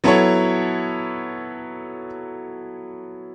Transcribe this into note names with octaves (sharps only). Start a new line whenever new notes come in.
F#3 B3 E4 A4 C#5